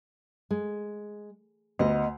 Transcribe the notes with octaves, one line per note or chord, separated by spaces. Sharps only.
G#3
D2 B3 D#5